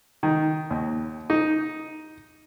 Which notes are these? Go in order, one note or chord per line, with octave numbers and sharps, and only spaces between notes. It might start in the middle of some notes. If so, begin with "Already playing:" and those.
D#3
D#2
D#4